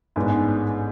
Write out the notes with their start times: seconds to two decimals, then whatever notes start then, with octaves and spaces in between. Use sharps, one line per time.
0.16 A1 G#2 G#3 B3 D4